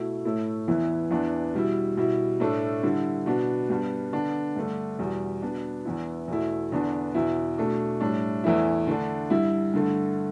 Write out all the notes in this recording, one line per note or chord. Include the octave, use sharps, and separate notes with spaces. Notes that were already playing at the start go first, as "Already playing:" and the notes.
Already playing: B2 A3 E4
A2 A3 E4
E2 E3 B3 E4
E2 E3 B3 D4
B2 G3 E4
B2 G3 E4
A2 A3 D4
D3 G3 E4
B2 B3 D4
G2 G3 B3 D4
D3 B3 D4
G2 D3 A3 D4
E2 B2 G3
B2 B3 D4
E2 E3 B3 E4
E2 B2 A3 E4
E2 D3 B3 D4
E2 B2 B3 E4
B2 A3 D4
A2 G3 D4
E2 E3 A3 E4
D3 A3 D4
G2 G3 E4
G2 D3 A3